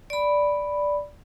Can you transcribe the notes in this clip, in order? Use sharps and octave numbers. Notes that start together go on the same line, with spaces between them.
D5 B5